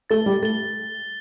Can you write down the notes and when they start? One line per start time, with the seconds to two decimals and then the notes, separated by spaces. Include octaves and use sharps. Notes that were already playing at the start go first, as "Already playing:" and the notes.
0.10 A3 A6 G7
0.26 G3
0.42 A3 A6 G7